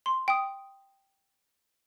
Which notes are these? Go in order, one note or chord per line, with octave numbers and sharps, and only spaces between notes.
C6
G5 D#6